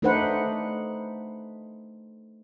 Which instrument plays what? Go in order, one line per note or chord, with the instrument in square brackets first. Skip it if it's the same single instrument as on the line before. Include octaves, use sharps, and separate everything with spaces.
[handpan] A3 D4 D#4 B4 C5 F#5